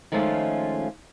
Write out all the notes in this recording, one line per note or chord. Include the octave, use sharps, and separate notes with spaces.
D#3 F3 G#3 A3 C#4 F4